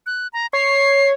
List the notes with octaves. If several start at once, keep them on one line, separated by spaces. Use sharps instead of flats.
F#6
A#5
C#5 C7